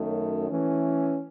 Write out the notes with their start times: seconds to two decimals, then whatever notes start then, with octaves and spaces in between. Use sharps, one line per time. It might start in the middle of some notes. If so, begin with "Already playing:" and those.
Already playing: F#2 D#3 A3
0.50 E3 A3 C#4